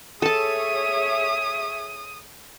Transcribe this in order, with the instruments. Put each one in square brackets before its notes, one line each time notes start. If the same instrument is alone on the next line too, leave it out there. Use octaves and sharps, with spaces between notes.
[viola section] G#4 C#5 E5 [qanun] A4 A5 [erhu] D#6